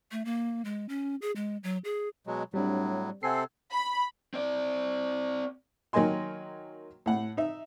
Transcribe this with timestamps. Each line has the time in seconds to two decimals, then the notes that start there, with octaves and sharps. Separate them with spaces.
0.11 A3
0.25 A#3
0.65 G#3
0.89 C#4
1.22 G#4
1.36 G#3
1.63 F#3
1.84 G#4
2.27 B2 F#3 G#3
2.54 A2 F#3 G3 C4 D4
3.23 C3 C4 A4 F#5 G#5 C7
3.72 B5
4.34 C4 D5
5.93 D#3 F#3 A#3 D#5 G#5 C6
7.06 A2 F#5
7.37 D#4 E5